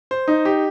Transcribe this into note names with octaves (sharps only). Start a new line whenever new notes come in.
C5
D#4
G4